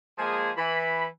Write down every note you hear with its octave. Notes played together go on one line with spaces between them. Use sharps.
F3 G#3 A#3 G#4
E3 B5